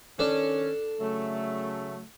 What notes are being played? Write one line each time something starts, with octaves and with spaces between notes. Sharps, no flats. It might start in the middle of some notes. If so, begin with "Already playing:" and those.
D#3 C#4 D4 A4 D5
C#3 F#3 A3